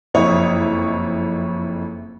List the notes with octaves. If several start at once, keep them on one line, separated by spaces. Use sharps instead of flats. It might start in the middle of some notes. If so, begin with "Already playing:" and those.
F#1 F2 E4 C#5 D#6